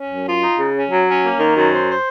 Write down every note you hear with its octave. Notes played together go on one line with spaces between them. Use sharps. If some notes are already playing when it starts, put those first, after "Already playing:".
Already playing: C#4
F#2
F4
D#4
C#3
C#4
F#3
C#4
A#3
D#3
F#2
C5
C5